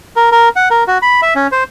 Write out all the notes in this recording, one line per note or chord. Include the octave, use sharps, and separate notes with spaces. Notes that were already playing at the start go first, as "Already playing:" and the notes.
A#4
A#4
F#5
A#4
F#4
B5
E5
C#4
C5